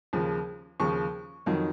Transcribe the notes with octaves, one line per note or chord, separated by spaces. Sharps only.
D#2 C#3 F3
D#2 C#3 F3 C#6
F2 D#3 F#3